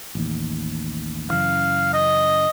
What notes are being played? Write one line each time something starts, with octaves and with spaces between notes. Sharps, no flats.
A1 D#2
F#2 C#3 E3 F5
D#5